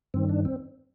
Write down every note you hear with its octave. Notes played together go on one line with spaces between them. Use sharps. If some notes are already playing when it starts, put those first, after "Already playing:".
G2 D#3 C4
D4
C4